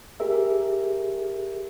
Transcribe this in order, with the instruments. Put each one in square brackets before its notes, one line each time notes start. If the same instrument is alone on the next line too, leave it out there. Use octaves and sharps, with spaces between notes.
[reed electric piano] G4 G#4 A#4 E5